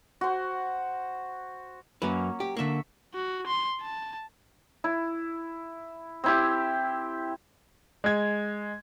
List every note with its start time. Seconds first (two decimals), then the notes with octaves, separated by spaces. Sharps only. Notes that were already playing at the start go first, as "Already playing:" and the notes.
0.21 F#4 C5
2.02 F#2 F#3 A#3 C#4 B4
2.40 G4
2.57 D3 A#3 E5 C#6
3.14 F#4
3.47 C6
3.82 A5
4.84 E4
6.24 C4 E4 G4
8.04 G#3 G#6